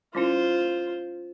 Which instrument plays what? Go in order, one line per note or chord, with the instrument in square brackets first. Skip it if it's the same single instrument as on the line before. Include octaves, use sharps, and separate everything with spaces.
[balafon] G3 C#4 E4 [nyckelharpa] F4 C5